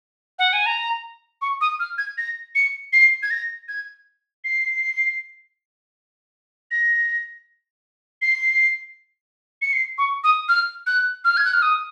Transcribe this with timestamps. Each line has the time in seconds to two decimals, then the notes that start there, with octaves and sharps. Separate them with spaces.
0.39 F#5
0.53 G#5
0.66 A#5
1.42 C#6
1.61 D#6
1.80 F6
1.98 G#6
2.18 A#6
2.55 C#7
2.93 C7
3.23 G#6
3.31 A#6
3.68 G#6
4.44 C7
6.71 A#6
8.22 C7
9.62 C#7
9.73 C7
9.98 C#6
10.24 D#6
10.49 F6
10.87 F#6
11.25 F6
11.37 G#6
11.45 F#6
11.53 F6
11.62 D#6